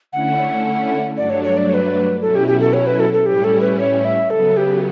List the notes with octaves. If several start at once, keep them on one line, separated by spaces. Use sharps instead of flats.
D3 A3 C#4 E4 F#5
G2 F#3 A3 D4 D5
C#5
C#5
D5
C#5
B4
B2 F#3 C#4 E4 A4
G4
G4
A4
C#5
B4
A4
A4
A2 G3 C#4 E4 G4
A4
B4
C#5
E5
C#3 F#3 B3 A4
G4